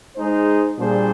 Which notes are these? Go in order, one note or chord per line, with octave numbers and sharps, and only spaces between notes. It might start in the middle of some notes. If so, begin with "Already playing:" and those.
G#3 D#4 G#4 C5
A#2 G3 D4 G#4 C5